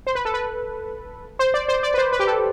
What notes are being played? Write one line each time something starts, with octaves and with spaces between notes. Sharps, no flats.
C5
B4
A4
B4
C5
D5
C5
D5
B4
C5
B4
G4
A4